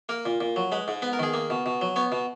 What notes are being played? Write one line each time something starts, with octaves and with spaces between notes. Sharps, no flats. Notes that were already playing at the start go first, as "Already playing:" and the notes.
A#3 A#4
A#2
A#2
F#3
G#3 B4
G#2
B3 B4
A#4
D#3 G#4
A#3
B2
B2
F#3
B3 C#5
B2